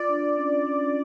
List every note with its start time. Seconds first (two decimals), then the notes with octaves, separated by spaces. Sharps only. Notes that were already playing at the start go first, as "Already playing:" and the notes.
Already playing: F4 D5
0.09 D4
0.38 C#4
0.67 C#4